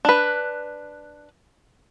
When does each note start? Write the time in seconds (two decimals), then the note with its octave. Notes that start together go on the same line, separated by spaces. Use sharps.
0.05 D4 B4